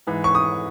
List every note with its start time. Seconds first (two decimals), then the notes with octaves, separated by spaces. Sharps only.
0.07 G#2 E3
0.24 C#6
0.35 D#6